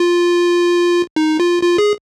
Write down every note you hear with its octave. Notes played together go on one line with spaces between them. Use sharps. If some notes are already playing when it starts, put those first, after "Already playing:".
Already playing: F4
D#4
F4
F4
G#4